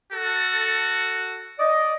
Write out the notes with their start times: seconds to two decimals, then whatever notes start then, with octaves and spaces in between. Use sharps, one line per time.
0.12 F#4 A4
1.59 D5 D#5